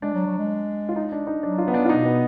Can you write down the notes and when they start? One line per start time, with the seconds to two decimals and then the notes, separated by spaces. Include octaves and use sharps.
0.02 G#3 D4
0.14 F#3
0.26 F#3
0.38 G#3
0.89 F4
0.96 D#4
1.12 D4
1.27 D#4
1.42 F#3 D4
1.58 F4
1.67 B3
1.74 D4
1.85 F4
1.89 B2 D#4
2.05 B3